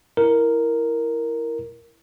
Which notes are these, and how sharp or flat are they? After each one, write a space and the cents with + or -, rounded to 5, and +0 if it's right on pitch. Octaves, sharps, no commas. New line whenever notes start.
E4 +0 A#4 +0